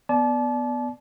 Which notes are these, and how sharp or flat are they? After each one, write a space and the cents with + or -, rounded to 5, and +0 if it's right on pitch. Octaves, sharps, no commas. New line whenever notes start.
B3 +0 D5 +0 A5 -35